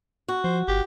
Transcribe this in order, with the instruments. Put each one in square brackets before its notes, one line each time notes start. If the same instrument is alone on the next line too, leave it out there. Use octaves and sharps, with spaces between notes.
[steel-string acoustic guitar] F#4
[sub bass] F3 [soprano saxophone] C5
[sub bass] G1 [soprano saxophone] G4